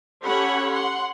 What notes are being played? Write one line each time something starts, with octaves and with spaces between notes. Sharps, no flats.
C#4 G4 A4 C#5 F#5 B5
F#5 C6